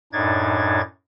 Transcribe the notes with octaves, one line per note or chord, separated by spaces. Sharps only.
F#2 A2 D4 D#4 G#6 A6